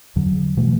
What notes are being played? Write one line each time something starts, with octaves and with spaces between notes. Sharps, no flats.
E2 D3 F#3
B2 E3 A3